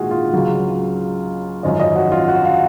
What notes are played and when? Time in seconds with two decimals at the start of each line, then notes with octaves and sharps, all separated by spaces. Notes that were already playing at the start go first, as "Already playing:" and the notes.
Already playing: A#1 G#2 D#3 G#3 F4 F#4 G#4
0.11 F4
0.33 C#2 C#3 F#3
1.63 G#1 F#2 F3 D#5
1.79 D#5
1.96 F#4
2.12 F4
2.28 F#4
2.45 F5